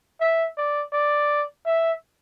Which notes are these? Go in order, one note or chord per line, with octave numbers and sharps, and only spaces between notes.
E5
D5
D5
E5